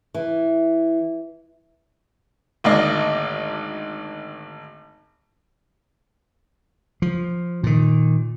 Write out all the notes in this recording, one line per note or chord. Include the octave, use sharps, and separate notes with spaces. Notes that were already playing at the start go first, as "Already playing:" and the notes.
E3
G#1 D2 A#3 D5 D#5
F3
A#2 D#3